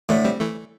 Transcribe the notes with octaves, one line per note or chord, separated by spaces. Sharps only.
A2 D3 E3 A3
G3 C4
E3 A3